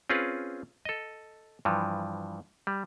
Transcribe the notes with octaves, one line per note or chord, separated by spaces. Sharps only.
C4 C#4 F4 G#4 B4
A4 D#5
G2 E3 F3
G3